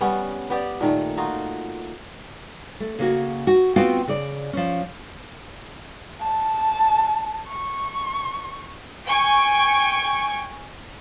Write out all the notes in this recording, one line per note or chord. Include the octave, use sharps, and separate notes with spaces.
G3 B3 C#4 F#5
B3 G4 D5
A#2 D#3 A3
D#4 F4 F#4
A3
C#3 A#3 F#4
F#4
B3 C4 F4 F#4 F5 G5
C#3 D5
F3 C#4
A5
C#6
G5 G#5 C#6